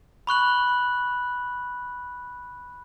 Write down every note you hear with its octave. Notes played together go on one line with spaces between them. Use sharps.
B5 C#6 F#6 F#7